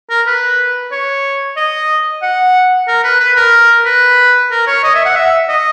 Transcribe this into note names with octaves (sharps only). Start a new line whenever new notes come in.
A#4
B4
C#5
D#5
F#5
A#4
B4
B4
A#4
B4
A#4
C#5
D#5
E5
F#5
E5
D#5